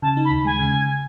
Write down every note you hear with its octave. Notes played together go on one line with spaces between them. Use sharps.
C#3 A5
D#4
B5
D#2
G#3 G#5
C#3